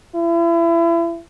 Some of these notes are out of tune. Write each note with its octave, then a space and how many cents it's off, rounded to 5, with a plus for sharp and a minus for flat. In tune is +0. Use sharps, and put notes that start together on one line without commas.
E4 +35